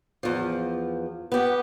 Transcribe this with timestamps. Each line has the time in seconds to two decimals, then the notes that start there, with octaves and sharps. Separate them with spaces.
0.23 E2 F3
1.32 B3 G4